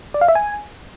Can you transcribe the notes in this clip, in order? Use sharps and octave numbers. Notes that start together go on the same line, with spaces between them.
D5
F5
E5
G#5